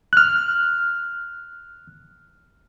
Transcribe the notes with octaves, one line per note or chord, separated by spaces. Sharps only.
F6 F#6